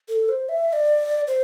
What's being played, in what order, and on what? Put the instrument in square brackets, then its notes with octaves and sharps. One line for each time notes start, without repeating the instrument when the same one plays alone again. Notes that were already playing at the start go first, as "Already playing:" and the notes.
[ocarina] A4
C5
E5
E5
D5
C5